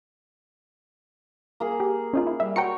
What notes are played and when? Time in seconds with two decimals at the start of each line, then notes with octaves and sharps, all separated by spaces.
1.60 A#3 G#4
1.80 G4
2.13 C#4 D#4 F4
2.27 E4
2.40 G3 E5
2.56 F#4 C#5 G5 A#5 C#7